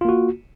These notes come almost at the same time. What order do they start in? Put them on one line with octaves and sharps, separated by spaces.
F4 A#3 F#4